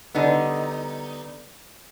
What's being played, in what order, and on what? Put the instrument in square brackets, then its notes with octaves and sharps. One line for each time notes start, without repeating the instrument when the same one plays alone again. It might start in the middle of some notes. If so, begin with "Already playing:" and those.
[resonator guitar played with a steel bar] D3 G3 B3 D#4